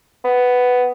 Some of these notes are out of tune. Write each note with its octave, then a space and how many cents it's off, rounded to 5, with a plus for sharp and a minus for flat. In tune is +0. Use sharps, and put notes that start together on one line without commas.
B3 +5